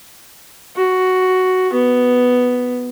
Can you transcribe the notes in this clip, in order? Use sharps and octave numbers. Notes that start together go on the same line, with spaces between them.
F#4
B3